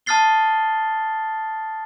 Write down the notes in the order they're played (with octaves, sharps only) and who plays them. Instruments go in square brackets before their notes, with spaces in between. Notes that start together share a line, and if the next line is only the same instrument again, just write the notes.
[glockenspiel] A5 D#6 F6 A6 C7 G7